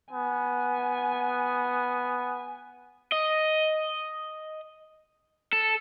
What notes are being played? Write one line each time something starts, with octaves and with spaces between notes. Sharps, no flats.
B3 G#5
D#5
A4